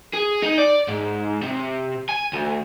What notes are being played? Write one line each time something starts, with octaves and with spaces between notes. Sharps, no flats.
G#4
D#4
D5
G#2
C3
G#5
D2